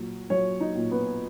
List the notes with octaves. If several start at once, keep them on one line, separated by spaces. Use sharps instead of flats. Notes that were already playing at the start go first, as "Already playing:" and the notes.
Already playing: A#2 F#3
F#3 C#5
D#4
A#2
B3